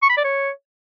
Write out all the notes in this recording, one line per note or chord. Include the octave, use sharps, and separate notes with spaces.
C#6
B5
D5
C#5